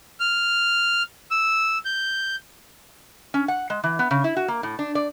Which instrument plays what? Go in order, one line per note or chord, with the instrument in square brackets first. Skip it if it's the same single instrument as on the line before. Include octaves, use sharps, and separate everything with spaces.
[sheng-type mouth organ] F6
E6
G6
[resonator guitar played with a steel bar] C#4
F#5
G#3
E3
B3
C#3
E4
F#4
A#3
A2
D4
D5